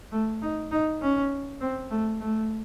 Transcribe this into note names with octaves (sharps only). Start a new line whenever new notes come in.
A3
D#4
D#4
C#4
C4
A3
A3